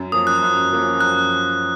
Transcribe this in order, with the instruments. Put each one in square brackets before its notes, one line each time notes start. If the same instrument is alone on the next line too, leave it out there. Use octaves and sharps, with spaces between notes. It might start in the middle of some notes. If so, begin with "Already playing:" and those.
Already playing: [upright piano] F#2
[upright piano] F3 A#3 C#4 [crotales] D#6
[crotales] F#6
[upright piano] F#2
F3 A#3 C#4
[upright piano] F#2 [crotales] F#6